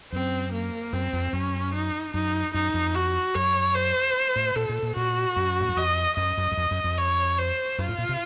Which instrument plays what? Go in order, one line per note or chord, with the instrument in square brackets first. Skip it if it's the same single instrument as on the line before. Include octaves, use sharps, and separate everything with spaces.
[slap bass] F#2 [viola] C4
[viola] A#3
[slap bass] F#2 [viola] C4
[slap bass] F2
[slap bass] F#2 [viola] C#4
[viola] D#4
[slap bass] F#2 [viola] D#4
[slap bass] F#2 [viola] D#4
[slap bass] F2
[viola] F#4
[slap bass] F#2 [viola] C#5
[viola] C5
[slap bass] A2
[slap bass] A#2 [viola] A4
[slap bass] A#2
A#2
[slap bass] A#2 [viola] F#4
[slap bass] F#2
A2
F#2
[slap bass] F2 [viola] D#5
[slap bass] F#2 [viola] D#5
[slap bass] F#2
F#2
F2
F#2
F2
[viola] C#5
C5
[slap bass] F#2 [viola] F4
[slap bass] A2
A#2
C3